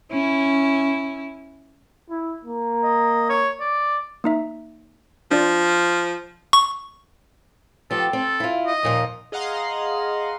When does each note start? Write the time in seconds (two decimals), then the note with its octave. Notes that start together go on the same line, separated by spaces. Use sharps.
0.11 C#4 E4
2.10 E4
2.45 A#3
2.84 D#5
3.29 C#5
3.60 D5
4.24 A#3 D#4 E5
5.31 F3 D4 F4 D5
6.53 C#6
7.91 F3 B3 G4 A4
8.13 C4 A4
8.40 E4 F4
8.66 D#5
8.83 D#2 A#2 F3
9.32 G#4 D#5 F5 F#5 A#5 C6